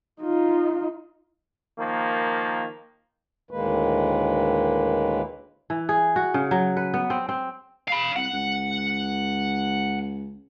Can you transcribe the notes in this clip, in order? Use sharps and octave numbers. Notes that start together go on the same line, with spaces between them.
D#4 F4
D#3 F3 A#3
D2 A2 D#3 G#3 A#3 B4
E3
G#4
F#4
C#3
F#3
B4
B3
C4
C4
F5 B5
C2 F#5
C#2